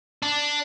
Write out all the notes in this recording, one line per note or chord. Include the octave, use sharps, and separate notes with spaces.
D4